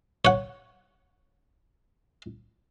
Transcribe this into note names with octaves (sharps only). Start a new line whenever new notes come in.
C#5 F#5